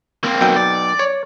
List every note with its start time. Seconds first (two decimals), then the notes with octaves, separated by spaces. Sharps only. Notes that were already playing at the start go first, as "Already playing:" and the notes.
0.24 A#3 C4
0.41 B1 B2 G5
0.56 D5
0.99 C#5